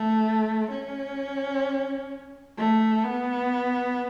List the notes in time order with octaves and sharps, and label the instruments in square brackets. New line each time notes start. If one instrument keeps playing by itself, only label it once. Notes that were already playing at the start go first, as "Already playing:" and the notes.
Already playing: [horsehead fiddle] A3
C#4
A3
B3